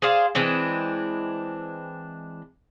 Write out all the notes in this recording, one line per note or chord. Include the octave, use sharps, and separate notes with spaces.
G#4 C5 D5 F5
E3 G#3 C4 D4